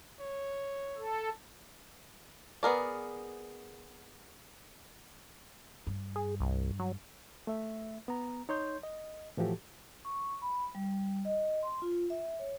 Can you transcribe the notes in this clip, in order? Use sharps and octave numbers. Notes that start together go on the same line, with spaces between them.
C#5
A4
B3 G#4 A#4 D5
G2
G#4
C2
F#3
A3 E5
B3 A#5
D#4 C#5 C6 G6
D#5
A2 E3 F3 F#4 G4 A4
C#6
B5
G3
D#5
C6
F4
E5
C#5